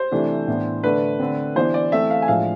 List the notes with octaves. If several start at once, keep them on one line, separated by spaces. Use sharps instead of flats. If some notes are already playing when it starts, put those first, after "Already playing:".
Already playing: C5
C3 E3 A3 D4
A2 E3 B3 D4
D3 A3 D4 B4
D3 A3 C4
E3 B3 D4 C5
D5
E3 A3 C4 E5
F5
G#5
A2 F3 G#3 D4 F5